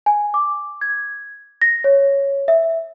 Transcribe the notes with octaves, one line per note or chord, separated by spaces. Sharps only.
G#5
D6
G#6
A#6
C#5
E5